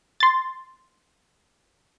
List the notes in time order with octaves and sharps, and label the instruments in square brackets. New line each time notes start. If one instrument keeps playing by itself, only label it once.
[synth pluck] C6 A6